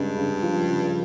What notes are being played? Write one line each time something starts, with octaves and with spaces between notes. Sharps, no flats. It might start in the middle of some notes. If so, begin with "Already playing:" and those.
Already playing: G2 C#3 G#3
C#3
F3
C#3